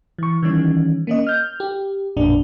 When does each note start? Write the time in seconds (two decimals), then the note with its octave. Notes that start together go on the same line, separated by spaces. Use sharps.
0.18 E3 C#6
0.43 D#3 E3 G3 C#4
1.07 A#3 C#4 D#5
1.27 F6 G6
1.60 G4
2.17 A1 F2 A#2 D4